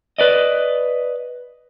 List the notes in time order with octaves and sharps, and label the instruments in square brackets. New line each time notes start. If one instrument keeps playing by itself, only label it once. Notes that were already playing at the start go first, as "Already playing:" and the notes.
[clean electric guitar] B4 D5 D#5